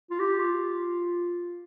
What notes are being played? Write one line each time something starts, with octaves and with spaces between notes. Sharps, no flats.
F4
G4
F4